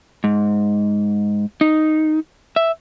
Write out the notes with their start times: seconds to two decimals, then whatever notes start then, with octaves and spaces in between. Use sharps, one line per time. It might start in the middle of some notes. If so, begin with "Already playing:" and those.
0.24 G#2
1.61 D#4
2.56 E5